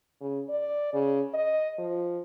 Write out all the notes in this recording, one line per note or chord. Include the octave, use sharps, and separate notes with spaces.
C#3
D5
C#3
D#5
F3